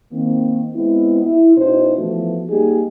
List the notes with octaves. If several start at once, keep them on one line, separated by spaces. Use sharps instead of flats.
D#3 A#3 C4
G#3 B3 C4 E4
E4
B2 C#4 D#4 E4 F#4 C5
E3 F3 A3 B3 F#4
G3 A#3 D#4 G4 G#4